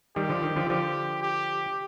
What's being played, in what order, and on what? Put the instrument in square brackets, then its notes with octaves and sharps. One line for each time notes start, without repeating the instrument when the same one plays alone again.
[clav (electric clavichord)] D#3 G3 [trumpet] G4
[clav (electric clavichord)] D3 F3
D#3
D3 F3
[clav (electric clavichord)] D3 F3 [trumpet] G4
[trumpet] G4